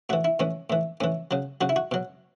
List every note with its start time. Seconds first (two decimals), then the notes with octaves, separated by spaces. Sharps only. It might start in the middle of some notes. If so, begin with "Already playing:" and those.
0.09 A2 E3 F#4
0.24 E4
0.40 A2 E3 C#4
0.70 A2 E3
1.00 A2 E3 C#4
1.31 C#3 F#3
1.61 C#3 F#3 F#4
1.69 E4
1.76 F#4
1.91 B2 F#3